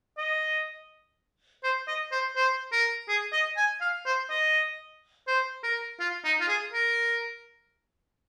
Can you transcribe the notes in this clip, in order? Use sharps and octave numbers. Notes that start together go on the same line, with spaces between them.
D#5
C5
D#5
C5
C5
A#4
G#4
D#5
G#5
F5
C5
D#5
C5
A#4
F4
D#4
F4
G#4
A#4